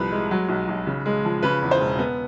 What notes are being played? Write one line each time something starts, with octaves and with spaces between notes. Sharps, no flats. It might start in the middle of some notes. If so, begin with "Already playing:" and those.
Already playing: C2 F3 B4
G#3
F#3
B1
B1
C#3
G#3
F3
C#3 B4
E2
C5
E1
B3